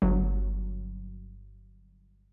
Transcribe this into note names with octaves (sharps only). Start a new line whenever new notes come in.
G1 F#3